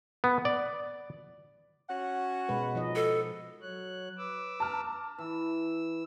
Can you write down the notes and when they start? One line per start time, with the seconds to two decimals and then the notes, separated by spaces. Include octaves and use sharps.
0.24 B3
0.45 D5
1.90 C#4 F#4 F#5
2.49 B2 G#3 B4
2.75 F3 D#4 D#5
2.95 A4
3.61 F#3 C#5 F#6
4.18 B4 D6 E6
4.60 A5 A#5 F6
5.18 E3 E6